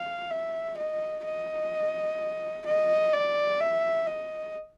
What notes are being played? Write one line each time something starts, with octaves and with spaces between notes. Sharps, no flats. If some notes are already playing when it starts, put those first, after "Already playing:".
Already playing: F5
E5
D#5
D#5
D#5
D5
E5
D#5